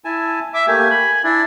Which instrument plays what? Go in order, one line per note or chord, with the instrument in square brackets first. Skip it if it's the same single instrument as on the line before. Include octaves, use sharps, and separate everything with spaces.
[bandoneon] E4 G#5 A5
[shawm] E5 [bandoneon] D6
[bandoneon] A3 A#3 G4 [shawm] G#5
[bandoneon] B5
[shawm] D4 [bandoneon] E4